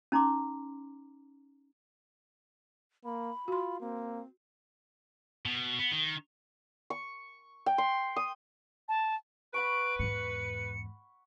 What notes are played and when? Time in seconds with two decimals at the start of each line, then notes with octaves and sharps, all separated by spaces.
0.12 C#4 D#4 A#5 C6 D6
3.04 A#3 B5
3.48 F4 F#4 C6
3.80 A#3 C4
5.45 B2
5.79 B3
5.92 D#3
6.90 C#6
7.66 G5
7.78 C6
8.16 D#6
8.89 A5
9.54 B4 F#5 B5 C#6 D7
9.99 E2 G#2 C#7